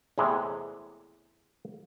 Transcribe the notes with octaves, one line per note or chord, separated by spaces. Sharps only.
E2 A2 C3 E3 G#3